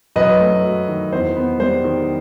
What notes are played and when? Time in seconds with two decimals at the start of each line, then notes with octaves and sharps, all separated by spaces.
0.16 F#2 B4 D#5
0.40 A3
0.64 F#3
0.88 D#3
1.12 E2 C5
1.36 B3
1.60 G3 C5
1.84 D#3